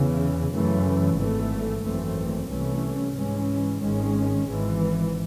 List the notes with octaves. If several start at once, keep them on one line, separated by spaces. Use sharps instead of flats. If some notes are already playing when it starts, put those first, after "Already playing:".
Already playing: E2 C#3 E3
F#2 C#3 E3 A3
G#1 G#2 E3 A3
G#1 F#2 E3 A3 C4
C2 C3 E3 A3 C#4
G#2 E3 G#3 C#4
G#1 G#2 D#3 G#3 C#4
G#1 G#2 E3